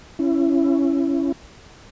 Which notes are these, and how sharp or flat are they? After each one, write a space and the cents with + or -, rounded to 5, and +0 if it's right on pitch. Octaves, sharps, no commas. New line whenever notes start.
C#4 +0 E4 +20